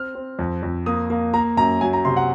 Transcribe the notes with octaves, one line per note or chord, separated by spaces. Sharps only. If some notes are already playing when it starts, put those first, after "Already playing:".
Already playing: C4 F6
C4
F2
F2
A#3 D#6
A#3
A#3 A#5
F#2 A#5
F#3 G#5
A#5
C3 C6
F#5